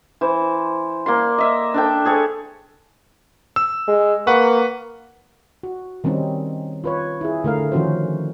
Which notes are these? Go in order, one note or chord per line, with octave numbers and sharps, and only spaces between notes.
E3 C5
A#3 D5 C6
D#5 E5
D4 A4 G5
G#4 A4 C#5
E6
G#3
A#3 B4 F#5 C#6
F#4
D#3 G3 C4 C#4 D#4
F4 B4 C#5
E4 G#4
D3 A3 A#4 F5
D#3 F3 C#4 F#4 C5